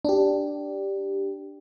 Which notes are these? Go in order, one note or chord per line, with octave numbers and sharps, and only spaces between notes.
D4 G4